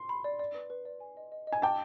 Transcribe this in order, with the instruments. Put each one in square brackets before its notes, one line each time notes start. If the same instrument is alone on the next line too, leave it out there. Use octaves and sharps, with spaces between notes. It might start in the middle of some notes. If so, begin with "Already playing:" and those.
Already playing: [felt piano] C6
[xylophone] B5
D5
D5
B4
B4
D5
G#5
D#5
D#5
D#5
[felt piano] G#5
[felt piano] G5 A5 [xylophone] D6